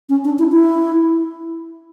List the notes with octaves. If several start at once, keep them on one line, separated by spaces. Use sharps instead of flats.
C#4
D4
E4
E4